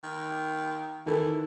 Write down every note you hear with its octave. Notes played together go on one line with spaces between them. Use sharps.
D#3
D#3 E3 A4